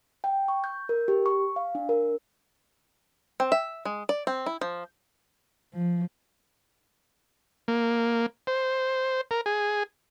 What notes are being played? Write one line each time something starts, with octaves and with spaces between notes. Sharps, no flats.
G5
C#6
G6
A#4
G4
C#6
F5
D4
A#4
C4
E5
G#3
D5
C4
E4
F3
F3
A#3
C5
A#4
G#4